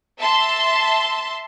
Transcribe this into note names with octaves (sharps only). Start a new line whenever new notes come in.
E5 A5 C6